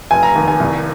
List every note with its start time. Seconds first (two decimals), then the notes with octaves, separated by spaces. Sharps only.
0.11 F1 G#5
0.23 A#5
0.36 D#2
0.48 G#5
0.60 C2